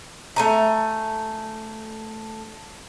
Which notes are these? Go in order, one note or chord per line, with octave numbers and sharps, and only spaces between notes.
A3 G#5 A#5